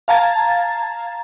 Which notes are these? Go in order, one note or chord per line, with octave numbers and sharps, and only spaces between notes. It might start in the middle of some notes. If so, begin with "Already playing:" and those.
F5 A5 A#5 G#6 A6